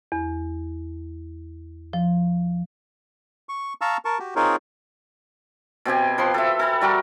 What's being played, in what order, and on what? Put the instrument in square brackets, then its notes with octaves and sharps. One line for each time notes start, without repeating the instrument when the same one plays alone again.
[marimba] E2
F3
[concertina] C#6
F5 A5 A#5 C#6 E6
A#4 A5 C#6
F#4 G4
C4 D#4 F4 G#4 A#4 C#5
[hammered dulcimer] B2 C4 G4 G#5
F3 B4 C6
A4 E5
A4 G#5 B5
G3 F#4 G4 A#4